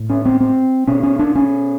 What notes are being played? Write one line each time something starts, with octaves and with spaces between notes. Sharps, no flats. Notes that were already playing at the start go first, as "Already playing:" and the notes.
Already playing: A2
C#4
C4
C4
B2 C#4
C#4
D4
C#4